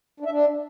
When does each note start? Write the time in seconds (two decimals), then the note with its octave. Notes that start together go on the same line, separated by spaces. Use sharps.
0.20 D4
0.26 E5
0.31 D4